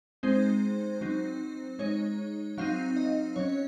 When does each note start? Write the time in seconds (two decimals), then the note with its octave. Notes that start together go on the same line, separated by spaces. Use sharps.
0.23 G#3 C4 D#4 C5
1.01 F#3 C4 D#4
1.79 G#3 D#4 C#5
2.58 F#3 C4 D#4 F5
2.96 D#5
3.36 F#3 C#4 C#5